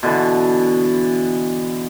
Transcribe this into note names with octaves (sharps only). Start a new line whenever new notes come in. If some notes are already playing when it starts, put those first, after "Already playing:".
B2 D3 E3